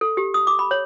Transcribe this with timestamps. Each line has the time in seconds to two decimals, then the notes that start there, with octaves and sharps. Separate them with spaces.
0.01 A4
0.17 G4
0.34 D#6
0.47 D6
0.59 B5
0.71 C#5